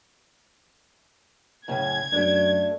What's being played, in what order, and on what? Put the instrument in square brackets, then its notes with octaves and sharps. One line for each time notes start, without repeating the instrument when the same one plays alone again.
[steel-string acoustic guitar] F#2 A2 C#3 [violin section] G#6
[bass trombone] F#2 [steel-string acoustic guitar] A3 D4